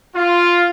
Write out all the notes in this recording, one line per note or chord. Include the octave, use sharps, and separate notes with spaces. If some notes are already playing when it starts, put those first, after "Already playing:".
F4